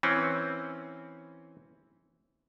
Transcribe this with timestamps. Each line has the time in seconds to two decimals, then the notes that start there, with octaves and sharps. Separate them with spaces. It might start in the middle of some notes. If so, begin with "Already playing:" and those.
0.03 E3 C4 C#4